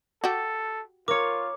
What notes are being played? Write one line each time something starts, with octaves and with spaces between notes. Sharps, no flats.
F#4 G4 A4
F4 A#4 C#5 D6